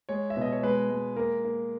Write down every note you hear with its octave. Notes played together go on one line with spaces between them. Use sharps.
G#3 C#5
E5
B2 D#5
C#5
G#3 B4
G#3
A#3 A#4
A#3